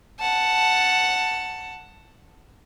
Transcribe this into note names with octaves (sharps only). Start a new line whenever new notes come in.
F#5 A5